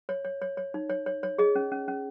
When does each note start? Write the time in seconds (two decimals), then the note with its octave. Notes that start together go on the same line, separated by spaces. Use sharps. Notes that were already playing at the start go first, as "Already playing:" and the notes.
0.09 C#5
0.25 C#5
0.42 C#5
0.57 C#5
0.74 D#4
0.90 C#5
1.06 C#5
1.23 C#5
1.38 G#4 D#5
1.55 C#4
1.72 C#4
1.88 C#4